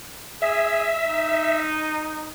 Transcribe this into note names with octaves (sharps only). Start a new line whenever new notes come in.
G#4 E5
D#4